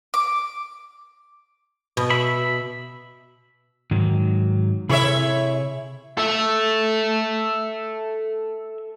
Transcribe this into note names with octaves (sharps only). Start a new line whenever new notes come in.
D6
B2
E5 B5
G#2 D#3 F#3
C3 E4 G#4 A4 C#5 E5
A4 E5